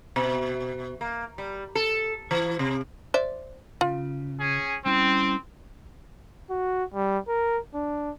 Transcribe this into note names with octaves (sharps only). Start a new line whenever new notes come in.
B2
A#3
G3
A4
E3
C3
C5 D5 E5
C#3 F4
C#4 G#4
G3 C4 C#4 E4
F#4
G3
A#4
D4